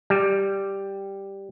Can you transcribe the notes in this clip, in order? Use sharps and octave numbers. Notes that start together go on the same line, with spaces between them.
G3